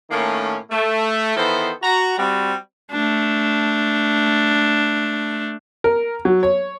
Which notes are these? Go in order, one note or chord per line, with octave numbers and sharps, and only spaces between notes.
A2 D#3 A3 A#3 C#4
A3
D#3 E3 B3 A4 C5
F#4 A#5
G3 C4 F#4
A3 D4
A#4
F#3
C#5